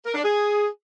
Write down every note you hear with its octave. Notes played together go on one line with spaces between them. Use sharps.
A#4
D4
G#4